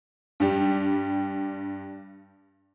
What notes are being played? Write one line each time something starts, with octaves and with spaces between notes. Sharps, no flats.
G2 G3